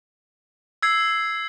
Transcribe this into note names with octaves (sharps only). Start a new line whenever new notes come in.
E6 G#6 C7